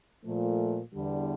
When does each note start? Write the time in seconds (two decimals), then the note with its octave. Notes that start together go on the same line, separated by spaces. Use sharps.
0.25 A#2 F3 A3
0.94 E2 D3 G3